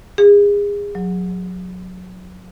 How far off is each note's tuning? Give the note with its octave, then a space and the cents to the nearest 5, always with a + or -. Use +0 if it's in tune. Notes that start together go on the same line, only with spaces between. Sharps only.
G#4 -30
F#3 -20